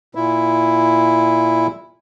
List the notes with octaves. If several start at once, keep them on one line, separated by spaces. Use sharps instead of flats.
A#2 E4